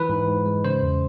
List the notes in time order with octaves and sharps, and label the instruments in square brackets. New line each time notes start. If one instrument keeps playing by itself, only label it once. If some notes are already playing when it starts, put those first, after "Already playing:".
Already playing: [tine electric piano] E3 B4
G#2
G#2
G#3
C#3 C5
E2